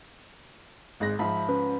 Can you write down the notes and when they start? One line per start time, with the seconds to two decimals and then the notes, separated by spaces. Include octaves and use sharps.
1.00 G#1 G#3 F#6 A#6
1.19 G#2 F3 E5 B5
1.49 C#4 B4